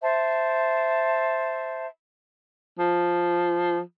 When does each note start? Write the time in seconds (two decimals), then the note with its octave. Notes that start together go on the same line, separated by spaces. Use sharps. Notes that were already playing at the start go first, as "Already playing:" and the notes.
0.01 C5 E5 A5
2.79 F3